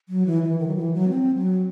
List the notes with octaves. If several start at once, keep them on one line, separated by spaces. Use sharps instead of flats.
F#3
E3
E3
D#3
F#3
E3
F#3
C4
F#3